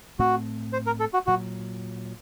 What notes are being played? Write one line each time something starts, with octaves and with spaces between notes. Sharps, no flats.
A2 A3 C4 F#4
C5
A#4
A4
F#4
A#2 F#3 F#4